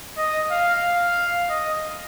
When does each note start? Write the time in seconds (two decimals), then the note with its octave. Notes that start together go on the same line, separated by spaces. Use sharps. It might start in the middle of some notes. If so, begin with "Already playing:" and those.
0.18 D#5
0.51 F5
0.84 F5
1.49 D#5